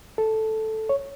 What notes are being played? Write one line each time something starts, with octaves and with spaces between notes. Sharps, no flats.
A4
C#5